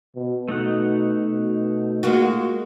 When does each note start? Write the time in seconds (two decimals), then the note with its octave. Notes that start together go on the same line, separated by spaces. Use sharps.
0.15 B2
0.48 B2 A3 D#4 F#5
1.32 B2
2.03 G#3 A#3 F4 F#4